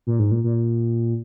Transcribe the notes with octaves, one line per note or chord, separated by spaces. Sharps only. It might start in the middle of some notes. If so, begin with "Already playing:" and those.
A#2
G#2
A#2
A#2